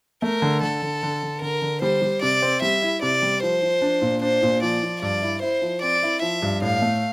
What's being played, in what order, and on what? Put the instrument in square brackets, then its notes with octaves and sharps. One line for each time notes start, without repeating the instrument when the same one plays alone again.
[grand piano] A3 [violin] A#4
[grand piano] D3
[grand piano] D3 [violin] A4
[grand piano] D3
D3
D3
[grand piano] D3 [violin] A#4
[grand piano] D3
[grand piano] G3 [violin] C5
[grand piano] G3
[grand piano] C3 [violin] D5
[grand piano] C4
[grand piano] G3 [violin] E5
[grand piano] E4
[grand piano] C3 [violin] D5
[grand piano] G3
[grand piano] F3 [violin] C5
[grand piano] F3
D4
A#2
[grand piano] D4 [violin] C5
[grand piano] A#2
[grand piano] F3 [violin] D5
[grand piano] F3
[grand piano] G2 [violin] D5
[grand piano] E4
[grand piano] E4 [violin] C5
[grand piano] F3
[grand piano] C4 [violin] D5
[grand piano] E4
[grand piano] F3 [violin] E5
[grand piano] G2
[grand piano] A2 [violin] F5
[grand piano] A3